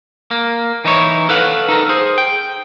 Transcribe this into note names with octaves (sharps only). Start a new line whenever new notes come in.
A#3
E3 D#4 E4 C#5
A4 B4 F5 F#5
D#4 A4 A#4
G#4 C5
G5